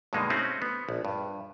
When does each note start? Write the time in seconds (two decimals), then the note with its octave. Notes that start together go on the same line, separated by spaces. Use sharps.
0.13 G2 B2 D3 G#3 A#3 D#4
0.30 A3 C4 C#4 D#4 F#4
0.62 B3
0.89 A#1
1.05 G2